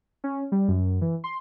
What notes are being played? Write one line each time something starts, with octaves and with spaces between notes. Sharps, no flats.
C#4
G3
F#2
E3
C6